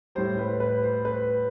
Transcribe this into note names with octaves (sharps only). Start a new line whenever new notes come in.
A2 G3 C5
B4
B4
C5
B4